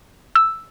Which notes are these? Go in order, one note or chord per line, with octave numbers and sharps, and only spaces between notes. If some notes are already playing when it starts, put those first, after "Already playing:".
E6